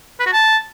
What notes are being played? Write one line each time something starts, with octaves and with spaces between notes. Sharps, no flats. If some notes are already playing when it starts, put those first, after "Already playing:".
B4
F#4
A5